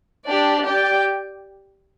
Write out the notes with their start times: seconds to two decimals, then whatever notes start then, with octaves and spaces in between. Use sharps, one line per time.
0.27 D4 G4 D5
0.65 G4 D5 G5